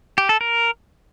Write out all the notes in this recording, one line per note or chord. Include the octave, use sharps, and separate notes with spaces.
G4
A4
A#4